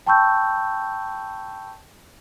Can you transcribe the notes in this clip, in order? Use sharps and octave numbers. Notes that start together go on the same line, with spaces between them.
G5 A5 B5 C#6 E6 G6